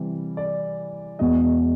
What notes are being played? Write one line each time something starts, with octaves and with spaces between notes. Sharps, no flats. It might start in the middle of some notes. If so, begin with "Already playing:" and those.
Already playing: C3 E3 G3
D5
E2 B2 G#3 D#5